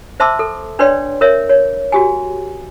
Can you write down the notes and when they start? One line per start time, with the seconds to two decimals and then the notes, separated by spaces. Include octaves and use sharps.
0.20 C5 E5 A5 C6 D6 E6
0.39 A4
0.79 D4 B4 C#5 D5 G5 C6
1.21 A#4 C#5 E5
1.49 C#5
1.92 F#4 G4 G#5